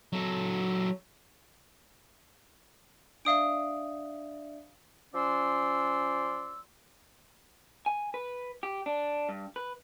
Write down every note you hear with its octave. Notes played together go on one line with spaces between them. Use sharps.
F#3 A4
D4 D5 E5 F5 D#6 D7
F3 C#4 D5 C6 E6
G#5
B4
G4
D4
G2
B4